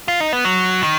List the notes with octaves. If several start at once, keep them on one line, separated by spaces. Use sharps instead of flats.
F4
D#4
B3
F#3
D#3